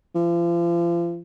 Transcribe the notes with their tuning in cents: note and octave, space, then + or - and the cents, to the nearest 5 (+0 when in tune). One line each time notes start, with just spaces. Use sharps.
F3 -35